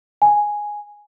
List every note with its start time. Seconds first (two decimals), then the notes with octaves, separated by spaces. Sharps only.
0.22 G#5